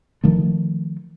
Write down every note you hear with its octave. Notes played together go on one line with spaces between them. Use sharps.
D#3 F3 A3